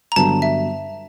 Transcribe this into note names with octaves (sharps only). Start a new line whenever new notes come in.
A#5
G2 D3 F#3 B3 A5
E5